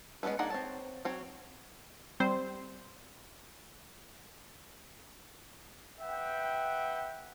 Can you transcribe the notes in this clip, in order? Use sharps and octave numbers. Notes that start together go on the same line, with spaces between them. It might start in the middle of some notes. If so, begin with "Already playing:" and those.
G#3 B3 C#4 E4 B4
A#3 D4 D#4 G#4 F#5
C4 C#5 A5
F#3 C4 C#5
G3 C4 C5
B4 E5 F#5 G5